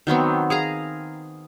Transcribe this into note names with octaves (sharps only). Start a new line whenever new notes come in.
D#3 F#3 B3 C4
G#4 F5 A#5